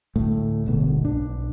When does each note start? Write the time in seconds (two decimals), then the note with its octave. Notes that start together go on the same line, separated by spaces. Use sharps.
0.16 D2 A2 A3
0.66 D1 G1 G#2 B2
1.05 B1 D4